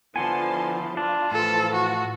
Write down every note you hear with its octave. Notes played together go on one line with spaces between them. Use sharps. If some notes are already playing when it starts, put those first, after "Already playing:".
D3 F3 B3 E4 F#5 G#5 A5 C6
D4 F4
A2 E3 F3 A4
F#4